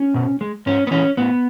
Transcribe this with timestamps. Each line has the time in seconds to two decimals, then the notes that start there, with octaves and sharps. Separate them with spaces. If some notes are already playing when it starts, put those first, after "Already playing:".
Already playing: C#4
0.14 B2
0.41 G#3
0.66 G#2 C#4
0.87 B3
0.91 E3 G#3 C#4
1.17 A2 B3